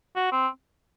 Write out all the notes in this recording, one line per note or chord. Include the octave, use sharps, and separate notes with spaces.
F#4
C4